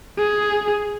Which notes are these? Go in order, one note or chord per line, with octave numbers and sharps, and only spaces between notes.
G#4